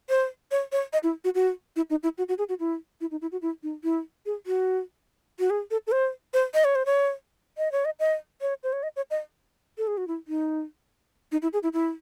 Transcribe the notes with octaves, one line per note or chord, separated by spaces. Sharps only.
C5
C#5
C#5
D#5
E4
F#4
F#4
E4
D#4
E4
F#4
F#4
G#4
F#4
E4
E4
D#4
E4
F#4
E4
D#4
E4
G#4
F#4
F#4
G#4
A4
A4
C5
C5
D#5
C#5
C5
C#5
D#5
C#5
D#5
D#5
C#5
C5
C#5
D#5
C#5
D#5
A4
G#4
F#4
E4
D#4
D#4
E4
G#4
E4
E4